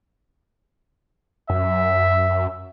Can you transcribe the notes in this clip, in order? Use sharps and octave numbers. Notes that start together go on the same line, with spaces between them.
F#2 E5